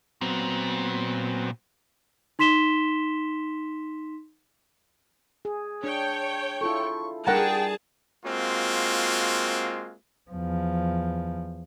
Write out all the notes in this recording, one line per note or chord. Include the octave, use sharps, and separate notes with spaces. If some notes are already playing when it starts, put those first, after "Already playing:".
A#2 F#3 B3 C4
D#4 C6 B6 E7 G7
G#4
D4 C#5 G5
E4 F4 A4 C#6
G3 D4 G#4 A#4 F#5 G5 A5 A#5
G#3 A#3 C4 F4 F#4
E2 F3